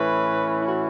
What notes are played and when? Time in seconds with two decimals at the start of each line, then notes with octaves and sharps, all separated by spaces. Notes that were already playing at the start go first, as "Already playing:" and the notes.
Already playing: A2 E3 C#4 B4
0.61 E4
0.66 F#4